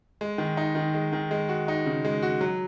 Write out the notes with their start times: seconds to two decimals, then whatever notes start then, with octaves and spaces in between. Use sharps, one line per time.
0.21 G#3
0.38 D#3
0.57 D#4
0.75 D#3
0.94 G#3
1.13 D#3
1.31 G#3
1.49 F#4
1.68 D#4
1.86 C#3
2.05 G#3
2.22 F#4
2.41 F#3